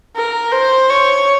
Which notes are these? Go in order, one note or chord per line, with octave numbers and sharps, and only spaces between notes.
A#4
C5
C#5